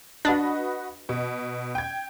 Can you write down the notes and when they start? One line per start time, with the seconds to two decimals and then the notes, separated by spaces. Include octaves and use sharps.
0.25 D4 F#4 B4 D#5
1.09 B2
1.75 G5 G#6